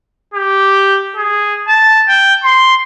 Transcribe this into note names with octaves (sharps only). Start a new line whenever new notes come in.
G4
G#4
A5
G5
C6